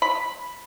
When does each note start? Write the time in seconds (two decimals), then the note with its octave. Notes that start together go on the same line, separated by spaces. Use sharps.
0.02 B5